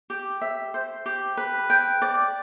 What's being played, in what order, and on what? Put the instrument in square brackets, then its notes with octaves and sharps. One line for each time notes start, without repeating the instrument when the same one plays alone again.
[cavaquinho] G4
E5
C5
G4
B4
G5
D5